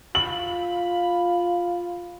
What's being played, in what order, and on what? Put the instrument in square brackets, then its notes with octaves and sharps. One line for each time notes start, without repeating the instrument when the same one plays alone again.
[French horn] F4 [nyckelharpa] B5 [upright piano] F#7